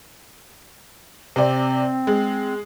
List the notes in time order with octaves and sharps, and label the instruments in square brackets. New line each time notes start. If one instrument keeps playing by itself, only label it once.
[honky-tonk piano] C3 D5 [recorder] C4
[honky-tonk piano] G#3